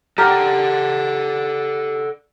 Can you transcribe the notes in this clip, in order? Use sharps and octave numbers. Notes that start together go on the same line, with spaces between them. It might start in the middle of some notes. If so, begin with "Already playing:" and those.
G4 A4 A#4 D5 F#5